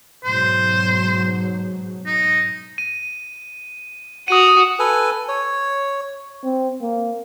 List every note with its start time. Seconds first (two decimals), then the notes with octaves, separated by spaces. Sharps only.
0.25 G#2 B2 F#3 C5
2.06 D#4
2.78 D#7
4.28 F#4 D#6 D#7
4.79 A4 B4 G#5
5.28 C#5
6.44 C4
6.81 A#3